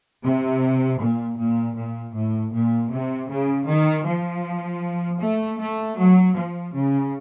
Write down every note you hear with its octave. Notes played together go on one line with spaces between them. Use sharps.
C3
A#2
A#2
A#2
A2
A#2
C3
C#3
D#3
F3
A3
A3
F#3
F3
C#3